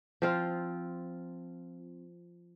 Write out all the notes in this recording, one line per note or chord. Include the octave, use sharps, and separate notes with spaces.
F3 C4 F4